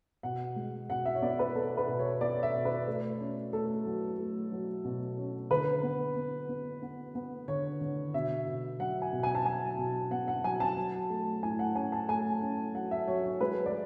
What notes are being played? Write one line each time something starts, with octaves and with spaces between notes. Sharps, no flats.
B2 F#5
G#3
B2 F#5
E5
C#5
B3 D5
B4
B3 A4
B4
B2
C#5
B3 D5
E5
B2
B4
A3
C#4
A3 A4
F#3
A3
F#3
B2
C#4
D3 B4
B3
B3
B3
B3
B3
D3 C#5
D3
B2 E5
B2
F#3 F#5
G#5
B2
G#5
A5
F#3 G#5
B2
B3 F#5
F#5
F#3 G#5
A5
F#3
A3
A2 G#5
F#5
C#4 G#5
A5
A3 G#5
C#4
F#3 F#5
E5
F#3 C#5
C#5
G#3 B4
D5